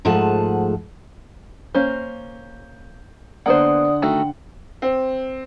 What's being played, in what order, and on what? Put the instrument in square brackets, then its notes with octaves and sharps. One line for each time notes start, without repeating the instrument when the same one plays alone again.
[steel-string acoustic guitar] G#2 F3 A3 G#4 F#5 A5
[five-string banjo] A#3 C#4 C5 [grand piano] G6
[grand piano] D3 F#5 [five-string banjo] A#3 B3 C5 [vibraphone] D5 D#6
[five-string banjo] D#3 A3 F#4 [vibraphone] G5
[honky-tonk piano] C4